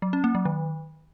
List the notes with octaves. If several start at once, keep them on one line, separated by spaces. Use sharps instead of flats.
F#3
C#4
A#3
F#3
D#3